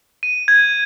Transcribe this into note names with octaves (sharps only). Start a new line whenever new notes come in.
D#7
G#6